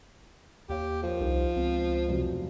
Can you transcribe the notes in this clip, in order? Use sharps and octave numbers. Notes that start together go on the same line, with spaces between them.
D#2 G4 C#5 F5
F3 A4 A#4 C#5
C2 D#4 G4 C5
C#2 B3 C4
F1 B2 F#3